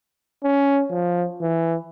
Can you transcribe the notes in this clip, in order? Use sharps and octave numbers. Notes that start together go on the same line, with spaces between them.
C#4
F3
E3